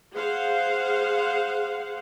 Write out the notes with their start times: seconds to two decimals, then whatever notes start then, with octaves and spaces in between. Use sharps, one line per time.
0.13 G#4 C5 F5 F#5